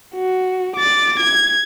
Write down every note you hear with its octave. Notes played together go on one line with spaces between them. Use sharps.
F#4
D6 A6
G#6